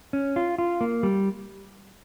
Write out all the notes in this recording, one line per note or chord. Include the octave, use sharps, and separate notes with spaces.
C#4
F4
F4
A#3
G3